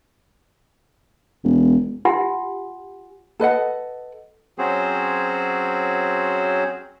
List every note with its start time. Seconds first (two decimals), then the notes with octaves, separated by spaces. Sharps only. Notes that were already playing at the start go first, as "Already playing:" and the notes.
1.44 E1
2.05 F4 G4 F#5 G#5 C6
3.40 A4 B4 D#5 F#5
4.58 F#3 C4 C#4 F#4 G#4 C5